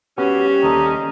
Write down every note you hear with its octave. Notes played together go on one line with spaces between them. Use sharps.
C3 G3 B3 C#4 F#4 G4
D#2 D#4 A4 D5